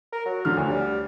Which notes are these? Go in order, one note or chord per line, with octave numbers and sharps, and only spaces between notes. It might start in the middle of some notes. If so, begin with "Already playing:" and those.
A#4
F#3
D3 F3 F6
D2
G3